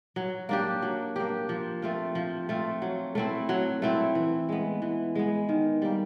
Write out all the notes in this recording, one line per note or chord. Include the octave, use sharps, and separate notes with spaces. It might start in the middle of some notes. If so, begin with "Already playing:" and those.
F#3
A#3 D4 G4
F#3
A#3 D4 G4
F3
A3 C4 F4
F3
A3 C4 F4
F#3
A3 C4 E4
F#3
A3 C4 E4
E3
G#3 B3
E3
G#3 B3
D#3
G3 A#3